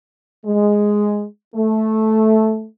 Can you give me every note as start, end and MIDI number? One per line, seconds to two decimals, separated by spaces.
0.45 1.24 56
1.55 2.65 57